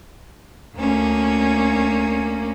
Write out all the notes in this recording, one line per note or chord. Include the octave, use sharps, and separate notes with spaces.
D2 A#3 C#4